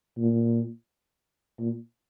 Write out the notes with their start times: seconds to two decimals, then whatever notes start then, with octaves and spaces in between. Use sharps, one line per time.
0.18 A#2
1.60 A#2